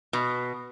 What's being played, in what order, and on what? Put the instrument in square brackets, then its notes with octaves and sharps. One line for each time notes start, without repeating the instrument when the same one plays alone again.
[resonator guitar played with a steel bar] B2